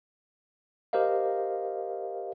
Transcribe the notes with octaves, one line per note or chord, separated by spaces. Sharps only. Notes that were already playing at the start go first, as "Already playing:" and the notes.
G4 A#4 C5 D#5 F5